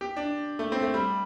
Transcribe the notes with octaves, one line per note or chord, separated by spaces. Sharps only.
G4
D4
A3
C4
A3
G3